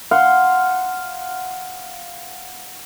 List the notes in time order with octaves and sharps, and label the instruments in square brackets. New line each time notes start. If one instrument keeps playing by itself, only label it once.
[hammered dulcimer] F5 F#5 C6